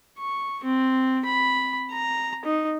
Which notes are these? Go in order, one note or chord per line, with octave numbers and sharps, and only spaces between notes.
C#6
C4
B5
A#5
D#4